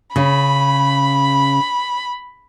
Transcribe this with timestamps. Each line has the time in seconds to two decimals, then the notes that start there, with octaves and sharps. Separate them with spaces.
0.16 C#3 B5